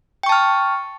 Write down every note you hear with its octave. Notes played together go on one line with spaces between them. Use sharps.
G5 A5 C#6 F6